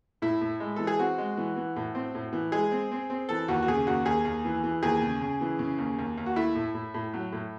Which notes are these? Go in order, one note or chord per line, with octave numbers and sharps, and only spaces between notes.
A2 E4
A2
G#3
E3 A4
G#4
C4 F#4
G#3
E3
E3
A2
C4
A2
E3
G#3 G#4
C4
C4
C4
E3 A4
D#2 F#4
F#4
C#3 G#4
D#2 F#4
D#2 G#4
D#2
E3
E3
D#2 G#4
C#3
C#3
E3
C#3
D#2
D#2
D#2
F#4
A3 E4
A2
A2
A2
F#3
A2